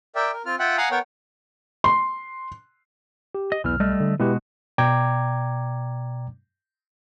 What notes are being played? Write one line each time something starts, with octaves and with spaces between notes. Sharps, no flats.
A#4 D5 E5 G5
A#4
C4 F4 F6
F4 E5 F#5 G5 F#6
F5 F#5 G#5 A#5 D#6 F#6
B3 A#4 C#5 F#5 G5
C6
G4
D#5
B1 E2 E3 F6
G3 A3 D#5
D3
B2 G#3 E4 F#4 G4 B4
B2 D5 G5 A#5 D6 G#6